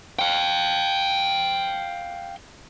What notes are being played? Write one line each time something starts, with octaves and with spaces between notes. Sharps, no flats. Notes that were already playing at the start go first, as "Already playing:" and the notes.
F5 G5